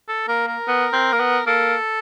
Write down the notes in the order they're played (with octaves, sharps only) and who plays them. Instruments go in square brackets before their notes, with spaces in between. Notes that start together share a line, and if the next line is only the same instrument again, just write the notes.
[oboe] A4
[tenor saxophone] A#3 [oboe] A#4
[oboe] A#4
[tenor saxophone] B3
C4
A#3
B3
[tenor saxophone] A#3 [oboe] A4